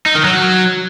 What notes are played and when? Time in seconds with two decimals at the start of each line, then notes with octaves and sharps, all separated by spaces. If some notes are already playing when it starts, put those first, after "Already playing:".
0.06 D#4
0.15 D#3
0.25 F#3